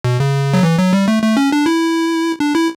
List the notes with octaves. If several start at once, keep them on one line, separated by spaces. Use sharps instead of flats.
B2
C#3
F#3
E3
F#3
G3
A3
A3
C#4
D4
E4
D4
E4